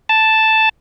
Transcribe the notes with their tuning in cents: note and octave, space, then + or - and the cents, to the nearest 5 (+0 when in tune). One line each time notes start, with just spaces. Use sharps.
A5 +0